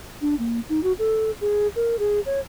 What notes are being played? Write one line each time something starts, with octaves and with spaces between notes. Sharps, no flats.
D4
A#3
D#4
F#4
A4
G#4
A#4
G#4
C#5